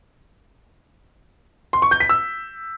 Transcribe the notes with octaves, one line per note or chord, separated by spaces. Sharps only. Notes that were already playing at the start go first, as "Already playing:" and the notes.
C6
C#6
G6
B6
E6